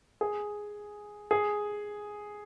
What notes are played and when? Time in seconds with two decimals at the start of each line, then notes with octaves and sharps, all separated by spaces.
0.21 G#4
1.31 G#4